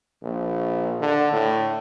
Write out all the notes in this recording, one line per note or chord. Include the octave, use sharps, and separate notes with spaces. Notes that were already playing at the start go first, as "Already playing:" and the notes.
A#1
D3
A2